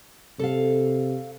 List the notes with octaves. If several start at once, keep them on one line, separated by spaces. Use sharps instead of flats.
C3 A4 F5